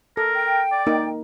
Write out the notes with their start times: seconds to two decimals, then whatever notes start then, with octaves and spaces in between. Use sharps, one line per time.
0.17 A4 A#4
0.35 G5
0.72 D5
0.87 A#3 D#4 A#4